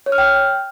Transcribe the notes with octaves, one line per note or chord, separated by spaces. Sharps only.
C#5
F6
G5